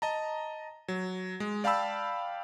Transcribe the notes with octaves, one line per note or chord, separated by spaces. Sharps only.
D#5 A5 A#5
F#3
G#3
D5 F5 G5 A5 B5 E6